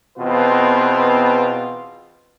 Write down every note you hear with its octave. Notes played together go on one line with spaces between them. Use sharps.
E2 B2 C4 F4 B4